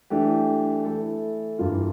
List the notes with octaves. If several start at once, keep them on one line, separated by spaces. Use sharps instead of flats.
E3 A3 D4 G4
E3 A3 E4 A4
G2 E3 A#3 F4